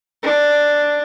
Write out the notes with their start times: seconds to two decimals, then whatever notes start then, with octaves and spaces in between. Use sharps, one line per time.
0.23 D4